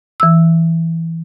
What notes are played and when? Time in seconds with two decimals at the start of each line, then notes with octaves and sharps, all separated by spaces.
0.20 E3 E6